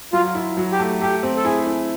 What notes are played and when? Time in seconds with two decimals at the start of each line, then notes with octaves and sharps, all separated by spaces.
0.13 F#3 F4
0.35 E4
0.57 F#3
0.72 G4
0.79 A3
1.01 A3 G4
1.23 C4
1.36 A4
1.45 E4 G#4
1.67 E4